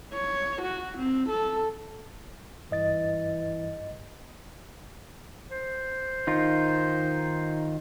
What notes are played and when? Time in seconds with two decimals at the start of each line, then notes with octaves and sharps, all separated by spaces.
0.13 C#5
0.62 F#4
0.98 C4
1.29 A4
2.71 G2 E3 D#5 A6
5.51 C5
6.27 D#3 D#4 F4